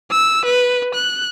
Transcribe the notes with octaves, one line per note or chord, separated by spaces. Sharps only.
E6
B4
F#6